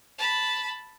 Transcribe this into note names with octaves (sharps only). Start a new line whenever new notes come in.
A5 B5